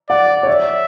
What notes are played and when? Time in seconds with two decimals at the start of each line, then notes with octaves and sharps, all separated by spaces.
0.09 D5 F#5
0.43 C#5
0.47 D5 E5